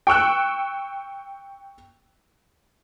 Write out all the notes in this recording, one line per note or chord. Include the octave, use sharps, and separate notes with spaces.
G5 C#6 E6 F#6